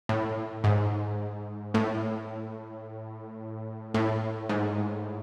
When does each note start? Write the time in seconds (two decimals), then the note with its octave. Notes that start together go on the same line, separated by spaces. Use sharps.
0.09 A2
0.64 G#2
1.74 A2
3.94 A2
4.49 G#2